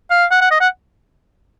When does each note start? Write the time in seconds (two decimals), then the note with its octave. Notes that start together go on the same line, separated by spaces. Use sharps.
0.10 F5
0.31 F#5
0.41 F#5
0.51 D#5
0.60 F#5